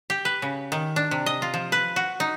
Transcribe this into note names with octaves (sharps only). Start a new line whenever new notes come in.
G4
B4
C#3
D#3
D4
C3
D#5
F4
F3
B4
F#4
D#4